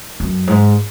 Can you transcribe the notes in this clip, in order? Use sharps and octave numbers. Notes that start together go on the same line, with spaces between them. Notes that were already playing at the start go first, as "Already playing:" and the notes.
F#2
G#2